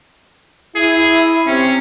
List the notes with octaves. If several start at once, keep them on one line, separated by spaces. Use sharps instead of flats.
E4 G#4
C3 C#4